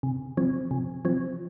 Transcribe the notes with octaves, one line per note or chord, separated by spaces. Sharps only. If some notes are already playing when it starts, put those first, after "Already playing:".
C3
F3 C4
C3
F3 C4